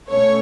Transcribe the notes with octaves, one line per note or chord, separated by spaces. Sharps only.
B2 A3 C#4 C#5